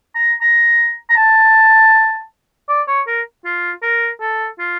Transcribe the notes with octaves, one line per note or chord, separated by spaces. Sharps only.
A#5
A#5
A#5
A5
D5
C#5
A#4
F4
A#4
A4
F4